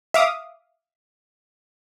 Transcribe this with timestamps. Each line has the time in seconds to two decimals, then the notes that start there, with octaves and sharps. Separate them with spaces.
0.14 E5 F5 D6 D#6